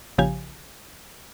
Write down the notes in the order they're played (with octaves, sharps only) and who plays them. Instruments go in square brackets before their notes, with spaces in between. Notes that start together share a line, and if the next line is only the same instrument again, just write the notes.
[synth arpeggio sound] A#1 C#3 F3 G4 F5 G#5